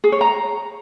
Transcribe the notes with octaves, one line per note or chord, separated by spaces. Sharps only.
G#4
C#5
A#5